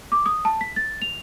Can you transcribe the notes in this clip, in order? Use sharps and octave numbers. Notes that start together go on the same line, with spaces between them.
D6
D#6
A5
B6
A6
F7